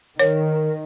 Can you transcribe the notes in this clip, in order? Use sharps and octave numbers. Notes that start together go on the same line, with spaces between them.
D#3 A#4 C#5